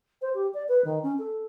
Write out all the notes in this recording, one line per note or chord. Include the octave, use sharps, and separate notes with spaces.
C5
G4
D5
B4
D#3
C#4
A4